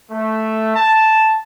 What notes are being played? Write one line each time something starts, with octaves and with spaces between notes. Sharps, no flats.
A3
A5